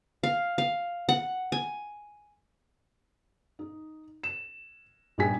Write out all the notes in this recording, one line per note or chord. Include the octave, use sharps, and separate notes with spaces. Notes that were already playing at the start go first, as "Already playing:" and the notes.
F5
F5
F#5
G#5
D#4
E7
A#1 G3 D#4 G4 G#5 B6